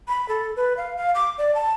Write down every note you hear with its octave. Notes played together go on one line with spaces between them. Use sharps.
B5
A4
B4
F5
F5
D6
D5
A5